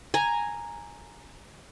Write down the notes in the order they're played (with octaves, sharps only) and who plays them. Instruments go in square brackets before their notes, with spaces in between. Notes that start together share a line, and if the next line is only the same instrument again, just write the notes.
[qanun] G#5 A#5